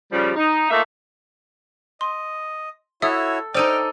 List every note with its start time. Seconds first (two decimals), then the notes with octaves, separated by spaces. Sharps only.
0.12 C#3 F3 G3
0.36 D#4
0.70 A3 A#3 D#4 F4 E5
2.01 D#5 C6
3.02 E4 F#4 A4 C#5 E5 D#6
3.55 D#4 A4 C5 D5 D#5 G5 F6 D#7